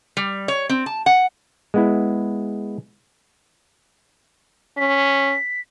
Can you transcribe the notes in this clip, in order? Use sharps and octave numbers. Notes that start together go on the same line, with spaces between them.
G3
C#5
C4
A5
F#5
G#3 B3 E4
C#4 B6